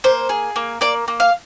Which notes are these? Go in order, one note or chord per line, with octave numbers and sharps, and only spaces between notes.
A#3 C5
G#4
A#3
A#3 D5
A#3
F5